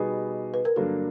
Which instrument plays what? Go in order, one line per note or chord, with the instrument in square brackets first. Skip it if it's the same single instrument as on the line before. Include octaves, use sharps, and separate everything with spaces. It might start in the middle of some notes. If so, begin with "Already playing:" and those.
Already playing: [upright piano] B2 G3 B3 D#4 G#4
[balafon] B4
A#4
[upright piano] G2 D3 F#3 A#3 D4 [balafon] A4